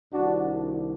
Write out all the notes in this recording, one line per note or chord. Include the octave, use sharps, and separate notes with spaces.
C2 C3 D#3 D4 F#4